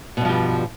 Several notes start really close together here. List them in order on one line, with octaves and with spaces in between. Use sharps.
B2 G2 F3 G3